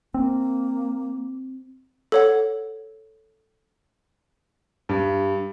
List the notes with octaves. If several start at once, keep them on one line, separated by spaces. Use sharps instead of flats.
A#3 C4
A4 C#5 F#5
G2